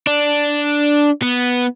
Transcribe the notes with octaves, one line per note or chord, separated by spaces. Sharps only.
D4
B3